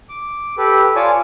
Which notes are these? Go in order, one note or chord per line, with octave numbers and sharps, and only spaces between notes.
D6
G4 A4 B4
F4 C#5 D5 G#5 A5